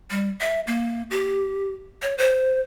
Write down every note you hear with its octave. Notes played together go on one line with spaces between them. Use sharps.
G3
E5
A#3
G4
C#5
C5